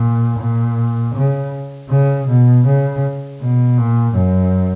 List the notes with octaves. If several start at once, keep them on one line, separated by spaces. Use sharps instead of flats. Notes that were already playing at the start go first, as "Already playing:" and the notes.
Already playing: A#2
A#2
C#3
C#3
B2
C#3
B2
A#2
F#2